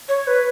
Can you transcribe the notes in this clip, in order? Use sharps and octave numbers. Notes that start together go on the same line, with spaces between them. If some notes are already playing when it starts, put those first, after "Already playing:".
C#5
B4